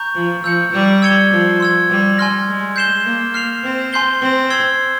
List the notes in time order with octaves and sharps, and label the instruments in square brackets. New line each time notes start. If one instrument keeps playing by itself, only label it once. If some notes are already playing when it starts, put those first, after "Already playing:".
Already playing: [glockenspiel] A#5 C#6 G6
[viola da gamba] F3
[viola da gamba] F3 [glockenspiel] E6 G6 C#7
[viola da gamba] G3
[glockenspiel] E6 G#6 C#7 G7
[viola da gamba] F3
[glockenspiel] C6 E6 G#6
[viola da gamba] G3
[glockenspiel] G#5 C6 F6 A#6
[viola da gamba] G#3
[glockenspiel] G6 C7 E7 G7
[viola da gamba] A#3
[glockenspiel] F6 C7 F7
[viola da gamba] C4
[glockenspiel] G#5 C6 G6 C7 G7
[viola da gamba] C4
[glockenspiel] E6 G#6 C7 G7